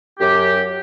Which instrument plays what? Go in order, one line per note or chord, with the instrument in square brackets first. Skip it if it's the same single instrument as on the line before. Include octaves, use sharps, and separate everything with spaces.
[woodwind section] F#2 G4